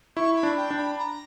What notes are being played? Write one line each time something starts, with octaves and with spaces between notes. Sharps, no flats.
E4 C#6
B5
D4
G5
D4
B5
A#5